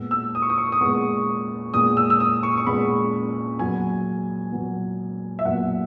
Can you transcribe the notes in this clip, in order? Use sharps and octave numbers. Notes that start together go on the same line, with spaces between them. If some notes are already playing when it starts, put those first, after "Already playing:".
Already playing: A#2 G#3 B3 E6
E6
D#6
C#6
D#6
C#6
D#6
A#2 G#3 B3 C#6
A#2 G#3 B3 D#6
E6
E6
D#6
C#6
C#6
A#2 G#3 B3 B5
A#2 F#3 B3 G#5
A#2 F#3 B3
E5
A#2 F#3 B3 F#5